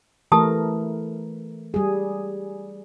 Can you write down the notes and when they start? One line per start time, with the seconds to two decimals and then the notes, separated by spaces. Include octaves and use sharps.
0.32 E3 A3 G4 A#4 A5 D#6
1.74 G3 G#4